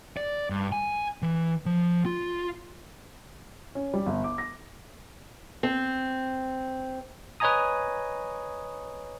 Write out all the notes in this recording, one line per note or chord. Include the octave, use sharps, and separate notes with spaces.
D5
G2
G#5
E3
F3
F4
C#4
G3
G1
D6
A#6
C4
B4 C#5 D#5 G#5 A#5 D#6